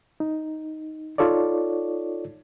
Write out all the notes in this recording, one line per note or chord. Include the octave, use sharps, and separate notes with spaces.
D#4
D#4 F4 A4 C#5 D5